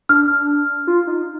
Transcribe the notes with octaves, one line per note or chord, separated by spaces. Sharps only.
D4 F6
F4
D#4